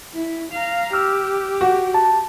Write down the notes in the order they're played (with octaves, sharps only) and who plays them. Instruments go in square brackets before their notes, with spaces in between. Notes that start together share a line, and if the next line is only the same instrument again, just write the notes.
[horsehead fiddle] E4
F5 A#5
[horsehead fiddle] G4 [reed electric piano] E6 F6
[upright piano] F#4
[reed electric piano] A5